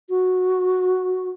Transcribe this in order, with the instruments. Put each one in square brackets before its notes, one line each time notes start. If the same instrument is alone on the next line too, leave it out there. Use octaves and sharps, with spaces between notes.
[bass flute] F#4